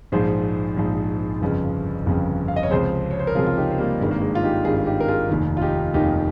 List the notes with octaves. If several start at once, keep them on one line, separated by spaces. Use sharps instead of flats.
A#1 G#2 F3 G#4 C5
A#1 G#2 F3
G1 F2 C#3 F3
G1 F2 C#3 F3
F5
D#5
C#5
C#2 C3 F3 G#4 C5
C#5
C5
A#4
C#2 C3 F3 F4 G#4
F4
D#4 G4
C4
G3 A#3
G#1 G2 D#3 G#3
A#3
G#3
F4
D#4 G4
G#1 G2 D#3 F4 G#4
D#4 G4
A#4
F4 G#4
F1 D#2 D#3
F4
D#4 G4
F1 D#2 D#3 D#4 G4